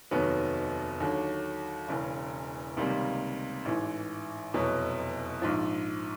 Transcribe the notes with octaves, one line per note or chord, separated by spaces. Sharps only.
F1 D#2 D#3 F#3 B3
D#2 D3 F#3
E1 E2 C#3
C#2 C3 D#3 G3 A#3
A1 G#2 E3
F1 E2 B2 F#3
A#1 G#2 F3